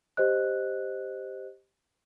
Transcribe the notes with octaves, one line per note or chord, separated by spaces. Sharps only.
G4 C5 D#5 F#6